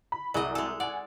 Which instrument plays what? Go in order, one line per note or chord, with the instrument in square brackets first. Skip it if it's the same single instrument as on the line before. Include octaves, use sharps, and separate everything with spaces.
[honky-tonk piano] B5
[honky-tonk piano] C2 G#4 D5 [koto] F#3 D#5
[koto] G#3 A4
[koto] D5 [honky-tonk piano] F#5 G#5